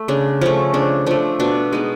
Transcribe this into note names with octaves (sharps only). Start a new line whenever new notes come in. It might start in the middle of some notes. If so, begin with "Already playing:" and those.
Already playing: A3
C#3 D4
F3 A3 C#4
C#3 D4
F3 A3 D4
B2 D4
G#3 B3 D#4